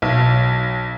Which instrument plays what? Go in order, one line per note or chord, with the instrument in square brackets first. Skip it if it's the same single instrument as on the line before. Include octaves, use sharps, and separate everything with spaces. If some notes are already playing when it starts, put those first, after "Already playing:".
[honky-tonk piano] B1